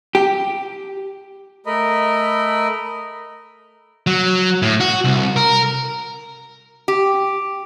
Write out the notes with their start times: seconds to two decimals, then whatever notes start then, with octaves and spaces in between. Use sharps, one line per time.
0.15 G4
1.66 A3 A#4 D#5 B5
4.07 F#3
4.62 A2
4.80 F#4
5.04 C2
5.36 A#4
6.88 G4